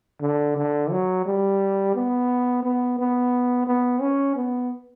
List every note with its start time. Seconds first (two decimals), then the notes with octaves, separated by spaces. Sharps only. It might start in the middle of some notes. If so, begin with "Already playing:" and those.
0.22 D3
0.57 D3
0.91 F#3
1.26 G3
1.95 B3
2.63 B3
2.99 B3
3.67 B3
4.01 C#4
4.36 B3